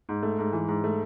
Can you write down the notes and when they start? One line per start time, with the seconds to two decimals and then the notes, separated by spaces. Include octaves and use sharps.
0.09 G#2
0.23 A3
0.38 G#2
0.53 E3
0.68 G#2
0.84 A3